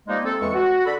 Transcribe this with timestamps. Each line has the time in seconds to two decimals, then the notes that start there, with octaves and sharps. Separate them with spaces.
0.08 F3 G3 G#3 A#3 D#4
0.24 C4 A4
0.41 E2 G#3 C#6
0.54 F#4
0.85 D3 A4 B5